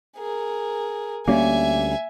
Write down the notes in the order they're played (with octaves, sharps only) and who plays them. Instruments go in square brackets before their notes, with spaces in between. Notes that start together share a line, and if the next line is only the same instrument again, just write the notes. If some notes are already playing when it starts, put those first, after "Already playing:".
[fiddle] G#4 A#4
[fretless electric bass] D2 G3 C#4 [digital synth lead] A#3 [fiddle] E5 G#5